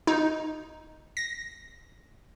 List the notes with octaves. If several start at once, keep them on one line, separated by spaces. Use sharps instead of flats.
D#4
A#6